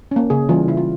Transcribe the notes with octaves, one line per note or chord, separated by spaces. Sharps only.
A#3 C#4
C#3 G#4
E3 G3 C#4 F4
C#3 E4
F4